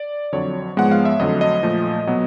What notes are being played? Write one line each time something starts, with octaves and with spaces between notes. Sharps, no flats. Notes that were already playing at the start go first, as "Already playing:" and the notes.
Already playing: D5
F2 D3 F#3 C#5
G#2 F3 G#3 B3 F#5
F5
E5
F2 D3 F#3 A3 D#5
D#5
A#2 F3 A3
B2 F#3 B3